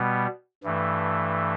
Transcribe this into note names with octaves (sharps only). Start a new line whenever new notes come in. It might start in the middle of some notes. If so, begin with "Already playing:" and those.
Already playing: B2 G3 B3
G2 E3 A3